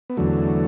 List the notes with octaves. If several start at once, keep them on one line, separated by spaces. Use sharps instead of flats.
B3
E2 D3 F#3 A3